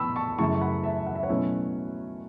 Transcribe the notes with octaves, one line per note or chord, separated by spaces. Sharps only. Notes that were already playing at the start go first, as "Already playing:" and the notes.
Already playing: B2 B3 E4 A5 B5 C#6 E6
A5 C#6
F#2 C#3 A3 E4 A5 C#6
C#6
F#5 B5
E5 A5
F#5
E5
C#5 F#5
B2 F#3 A3 C#4 E4